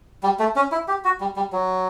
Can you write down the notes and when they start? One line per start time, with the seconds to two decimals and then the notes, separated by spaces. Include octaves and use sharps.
0.23 G3
0.40 A3
0.56 C#4
0.72 E4
0.88 G4
1.05 F#4
1.20 G3
1.36 G3
1.53 F#3